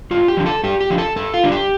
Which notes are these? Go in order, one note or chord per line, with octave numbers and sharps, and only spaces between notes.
G2 F4
G4
D3 F3
A4
G2 G4
G4
D3 F3
A4
G2 A4
F4
D3 G3 D4
G4